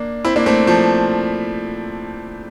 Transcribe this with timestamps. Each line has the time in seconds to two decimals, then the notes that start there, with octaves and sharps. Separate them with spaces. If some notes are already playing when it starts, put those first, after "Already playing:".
Already playing: A#3 D4
0.25 C4 E4
0.36 A#3 D4
0.46 A3 C4
0.67 F3 A3